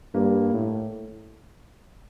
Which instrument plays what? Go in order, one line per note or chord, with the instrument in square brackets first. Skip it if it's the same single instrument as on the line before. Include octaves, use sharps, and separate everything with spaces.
[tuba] G2 [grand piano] G3 A#3
[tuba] A2